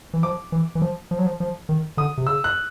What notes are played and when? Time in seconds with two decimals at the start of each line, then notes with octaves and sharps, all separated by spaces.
0.13 E3
0.23 F3 D6
0.52 E3
0.75 E3
0.82 F3
1.11 F3
1.19 F#3
1.26 F3
1.40 F3
1.69 D#3
1.97 D3 D#6
2.17 C3
2.27 C#3 E6
2.44 F#6